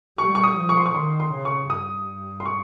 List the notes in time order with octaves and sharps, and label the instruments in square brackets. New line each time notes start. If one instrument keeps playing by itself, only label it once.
[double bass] G3 [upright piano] C#6
[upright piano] C#6
D#6
[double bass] F3
[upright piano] C#6
C6
C#6
[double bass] D#3 [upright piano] C6
[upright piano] C6
[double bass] C#3
[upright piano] C#6
[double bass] G2 [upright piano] D#6
[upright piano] C6
C#6